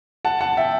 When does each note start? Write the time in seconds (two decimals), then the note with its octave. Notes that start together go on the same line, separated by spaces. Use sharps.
0.25 F#5 A5
0.41 F#5 A5
0.57 E5 G5